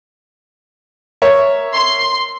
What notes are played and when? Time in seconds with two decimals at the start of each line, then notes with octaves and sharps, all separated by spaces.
1.22 A#4 C#5 E5
1.74 C6